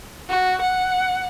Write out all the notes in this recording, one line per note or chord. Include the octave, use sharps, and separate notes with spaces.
F#4
F#5